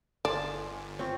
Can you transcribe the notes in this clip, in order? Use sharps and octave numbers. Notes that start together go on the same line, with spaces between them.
G1 A4 D5 G#5 A5 C6
C4 F4 C#5 C#6